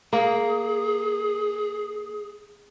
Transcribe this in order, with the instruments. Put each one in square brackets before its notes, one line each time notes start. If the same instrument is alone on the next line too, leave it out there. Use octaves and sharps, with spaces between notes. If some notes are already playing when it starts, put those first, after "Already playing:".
[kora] A#3 [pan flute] G#4